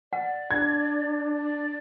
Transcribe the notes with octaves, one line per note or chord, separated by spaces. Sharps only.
D5 F#5
D4 G#6
D5